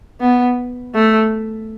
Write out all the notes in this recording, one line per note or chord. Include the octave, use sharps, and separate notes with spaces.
B3
A3